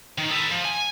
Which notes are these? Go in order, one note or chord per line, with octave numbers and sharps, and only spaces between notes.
D#3
A4 B4
F3
G#5